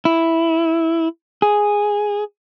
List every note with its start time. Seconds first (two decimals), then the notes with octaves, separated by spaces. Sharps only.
0.05 E4
1.42 G#4